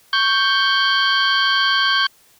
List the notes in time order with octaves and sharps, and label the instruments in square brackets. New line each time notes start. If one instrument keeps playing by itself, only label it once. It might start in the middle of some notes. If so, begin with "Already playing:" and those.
[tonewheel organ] C#6 G6